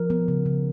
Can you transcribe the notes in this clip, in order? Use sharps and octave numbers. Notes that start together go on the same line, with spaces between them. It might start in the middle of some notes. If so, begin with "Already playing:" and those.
Already playing: F3 A#4
B3
C#3
C#3